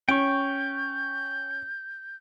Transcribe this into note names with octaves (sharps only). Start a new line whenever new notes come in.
C#4 G5 C#6 G6